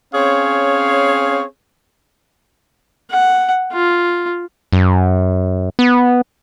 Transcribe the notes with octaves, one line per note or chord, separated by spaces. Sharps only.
C4 C#4 G#4 C#5 F5
F#5
F4
F#2
B3